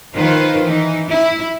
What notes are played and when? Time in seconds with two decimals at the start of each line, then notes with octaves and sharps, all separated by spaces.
0.16 D#3 F3 D#4 F4 B4 C5
0.64 E3 D#4
1.08 E4